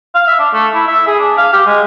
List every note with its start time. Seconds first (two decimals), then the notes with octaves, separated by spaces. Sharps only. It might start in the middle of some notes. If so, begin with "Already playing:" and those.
0.15 F5
0.28 E5
0.39 D4
0.54 A3
0.75 E4
0.88 E5
1.07 G#4
1.19 D4
1.38 F5
1.53 G4
1.67 G#3